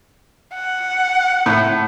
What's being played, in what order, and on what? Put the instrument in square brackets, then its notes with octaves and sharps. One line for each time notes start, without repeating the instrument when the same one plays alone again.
[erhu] F#5
[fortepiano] A2